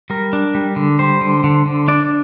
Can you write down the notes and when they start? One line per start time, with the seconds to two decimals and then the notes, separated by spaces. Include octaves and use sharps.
0.10 G3 A#4
0.33 D4
0.55 G3
0.76 D3
0.99 G3 C5
1.21 D3
1.44 D3
1.66 D3
1.88 D4 D5